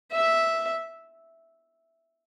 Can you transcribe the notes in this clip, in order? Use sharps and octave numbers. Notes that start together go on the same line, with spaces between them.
E5